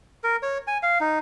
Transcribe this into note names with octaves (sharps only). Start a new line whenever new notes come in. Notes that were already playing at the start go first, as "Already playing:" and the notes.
A#4
C#5
G#5
F5
D#4